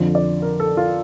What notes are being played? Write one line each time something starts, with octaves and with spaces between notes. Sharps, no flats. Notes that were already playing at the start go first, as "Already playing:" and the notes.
Already playing: F2 D3 F3
D5
A#4
A4
F4